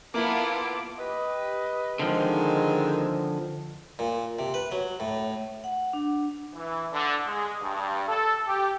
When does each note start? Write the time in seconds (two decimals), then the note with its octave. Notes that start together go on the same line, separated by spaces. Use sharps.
0.14 A#3 B3 E4 F4 A4 D6
0.99 G4 B4 D#5
1.99 D3 D#3 F3 G#3 C4
3.99 A#2
4.39 C3
4.54 B4
4.72 F#3
5.00 A2
5.64 F#5
5.93 D4
6.54 E3
6.92 D3
7.27 G#3
7.61 G2
8.08 A4
8.47 G4